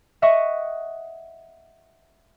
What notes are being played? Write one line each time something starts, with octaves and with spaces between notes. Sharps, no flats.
D#5 E5 F#5 C#6 D#6